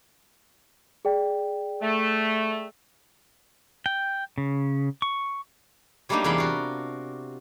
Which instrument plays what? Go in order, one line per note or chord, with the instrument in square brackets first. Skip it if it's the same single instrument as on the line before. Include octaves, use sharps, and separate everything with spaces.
[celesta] G#4 D5 G5
[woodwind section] A3
[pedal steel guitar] G5
C#3
C#6
[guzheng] F#3 G3 A3 A#3 D4 D#4
E2 C3 A#4 F5 B5 C6
F4 F#4